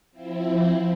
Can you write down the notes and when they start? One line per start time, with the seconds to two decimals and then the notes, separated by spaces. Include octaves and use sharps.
0.11 F3 C4 E4